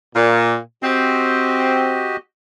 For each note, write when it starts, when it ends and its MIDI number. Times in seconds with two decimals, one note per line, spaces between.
0.15 0.56 46
0.83 2.14 60
0.83 2.17 66
0.83 2.17 67
0.83 2.17 75